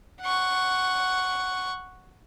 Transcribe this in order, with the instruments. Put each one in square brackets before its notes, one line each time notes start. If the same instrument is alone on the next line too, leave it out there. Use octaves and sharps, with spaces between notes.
[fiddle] F#5 C#6